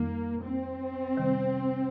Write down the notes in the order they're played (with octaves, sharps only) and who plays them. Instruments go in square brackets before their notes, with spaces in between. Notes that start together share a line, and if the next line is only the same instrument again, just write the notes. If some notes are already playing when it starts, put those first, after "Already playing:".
Already playing: [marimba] F2 D#3 G3 D#4 [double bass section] A#3
[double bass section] C4
[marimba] C3 D#3 G3